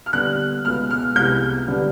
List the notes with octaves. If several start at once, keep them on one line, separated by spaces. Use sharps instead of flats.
F6
D#2 D3 G3 B3 F#6
C#2 B2 G#3 B3 F6
F6
C2 C3 F3 G#3 B3 G6
D3 G3 B3